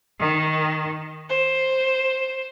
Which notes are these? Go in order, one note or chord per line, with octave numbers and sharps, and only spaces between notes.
D#3
C5